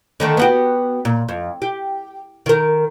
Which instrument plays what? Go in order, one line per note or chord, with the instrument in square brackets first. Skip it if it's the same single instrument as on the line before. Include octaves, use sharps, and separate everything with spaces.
[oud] D3 D#3 A3
B3 F#4 G4
A#2
F2
G4
D#3 A#4